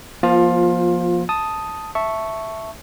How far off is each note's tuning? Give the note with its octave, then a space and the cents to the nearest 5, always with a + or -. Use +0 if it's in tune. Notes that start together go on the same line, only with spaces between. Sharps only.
F3 +0 A#3 +40 F4 +20
A5 +0 D#6 +0
E5 +0 A5 +0 C#6 +0